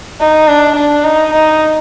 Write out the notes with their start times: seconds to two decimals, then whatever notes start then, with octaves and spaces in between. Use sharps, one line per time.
0.20 D#4
0.48 D4
0.76 D4
1.05 D#4
1.33 D#4